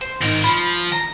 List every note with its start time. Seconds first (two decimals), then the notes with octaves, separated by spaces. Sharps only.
0.01 C5
0.22 G#2 D#4 A#4
0.44 F3 B5
0.92 A#5